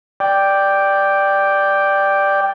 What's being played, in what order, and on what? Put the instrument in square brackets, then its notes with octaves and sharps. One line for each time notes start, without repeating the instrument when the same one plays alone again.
[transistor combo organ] D5 G5